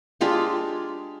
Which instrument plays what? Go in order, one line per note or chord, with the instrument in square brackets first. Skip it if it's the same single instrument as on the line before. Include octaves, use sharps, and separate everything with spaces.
[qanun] G#3 D4 F4 G4